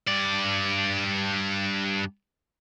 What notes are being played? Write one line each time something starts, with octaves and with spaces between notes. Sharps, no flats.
G2 D5